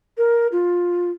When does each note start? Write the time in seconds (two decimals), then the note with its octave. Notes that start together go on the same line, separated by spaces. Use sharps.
0.18 A#4
0.52 F4